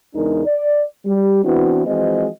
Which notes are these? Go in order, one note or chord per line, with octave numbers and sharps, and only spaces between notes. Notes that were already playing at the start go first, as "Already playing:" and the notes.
E2 C#3 G#3 D4 D#4 A#4
D5
G3
E3 B3 C4 D4 E4 F#4
E3 F3 G#3 C4 F#4 D#5